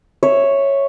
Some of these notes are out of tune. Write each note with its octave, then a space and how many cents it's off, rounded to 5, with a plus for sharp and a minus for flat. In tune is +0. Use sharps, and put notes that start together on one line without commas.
C#5 -5 E5 +0